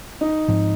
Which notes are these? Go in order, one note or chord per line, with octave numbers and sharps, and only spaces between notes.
D#4
G#2 F3 C4